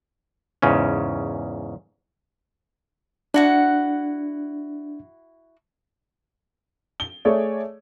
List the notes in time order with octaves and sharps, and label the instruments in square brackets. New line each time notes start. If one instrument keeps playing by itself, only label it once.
[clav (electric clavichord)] E2 G#2 C#3 C#4
[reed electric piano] D4 [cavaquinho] E4 F#4 F#5
[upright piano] G7
A3 G#4 C#5 D5